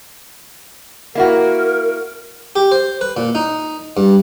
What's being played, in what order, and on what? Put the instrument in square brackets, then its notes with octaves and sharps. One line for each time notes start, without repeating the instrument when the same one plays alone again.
[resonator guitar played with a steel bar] A#3 E4 F#4 [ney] A#4
[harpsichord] G4
C5
B4
A#2
D#4
G2